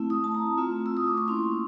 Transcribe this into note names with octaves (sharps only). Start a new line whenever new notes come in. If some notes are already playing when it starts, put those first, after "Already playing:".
Already playing: A3 C4 E4
D#6
A5
A#5
A3 C4 F4
E6
D#6
D6
C#6
A#3 C#4 E4 C6